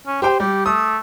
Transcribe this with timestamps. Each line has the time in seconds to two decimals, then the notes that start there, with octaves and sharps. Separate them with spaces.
0.07 C#4
0.22 G4 C5 G5
0.40 G3 G4
0.66 A3 D#6